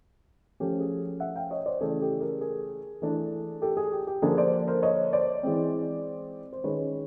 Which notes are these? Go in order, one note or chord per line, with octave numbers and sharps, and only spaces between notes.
F3 A3 C#4 G4
G#4
E5 F#5
F5 G5
C#5 D#5
C5 D5
C#3 E3 A3 G#4
G4 A4
G#4 A#4
G#4 A#4
E3 A3 D4
G4 A4
G#4
G4
G4
D3 F3 A#3 D4 G#4
C5 D5
A#4 C5
C#5 D#5
C5 D5
E3 G#3 C4
C5
D#3 G#3 C#4 B4 C#5